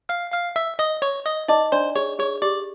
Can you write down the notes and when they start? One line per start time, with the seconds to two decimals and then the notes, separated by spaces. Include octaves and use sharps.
0.09 F5 F6
0.33 F5 F6
0.56 E5 E6
0.79 D#5 D#6
1.02 C#5 C#6
1.26 D#5 D#6
1.48 D#4 D5 D#5 D6
1.72 D4 C5 D5 C6
1.95 G#4 C#5 C#6
2.19 G#4 C#5 C#6
2.42 G4 D5 D6